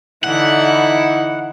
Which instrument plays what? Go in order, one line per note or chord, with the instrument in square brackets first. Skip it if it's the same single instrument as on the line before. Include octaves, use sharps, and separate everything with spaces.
[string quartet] D3 E3 [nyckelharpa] D#4 E4 [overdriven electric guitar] F#5